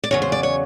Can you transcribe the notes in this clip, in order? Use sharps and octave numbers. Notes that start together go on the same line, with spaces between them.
D5
E2 C#3 F#3 C#5
C5
D5
C#5